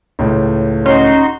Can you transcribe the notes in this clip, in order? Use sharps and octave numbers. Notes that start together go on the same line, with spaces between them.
C#2 A2
C#4 D#4 F#4 C6